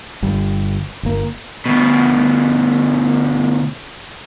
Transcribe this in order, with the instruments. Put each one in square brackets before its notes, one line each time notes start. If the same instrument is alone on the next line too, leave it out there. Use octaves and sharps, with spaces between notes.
[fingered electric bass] G1 G3
G1 A#3
[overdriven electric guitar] D2 B2